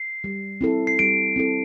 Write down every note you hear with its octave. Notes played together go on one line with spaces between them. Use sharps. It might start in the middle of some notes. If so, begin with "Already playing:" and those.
Already playing: C7
G3
C4 E4 A4
C7
G3 D7
C4 E4 A4